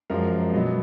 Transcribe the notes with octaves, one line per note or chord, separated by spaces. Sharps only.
F#2 F3 G#3 A#4
B2 F#3 B3 D#5